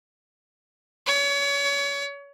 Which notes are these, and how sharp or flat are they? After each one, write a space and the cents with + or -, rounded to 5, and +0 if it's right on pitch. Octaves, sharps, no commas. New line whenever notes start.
C#5 +30